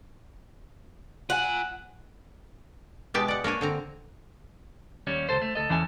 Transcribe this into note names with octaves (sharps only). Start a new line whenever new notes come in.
F4 F#5 G#5
B2 G#3 B3 G4 E5 A5
D5 F#5
A#3 D4 C#5 G#5
D3 C4 A#5
D#2 G3 C#4
C#2 F#2 A4 C5
A3
D2 A4 D#5
E2 E3 C#4 A4 G#5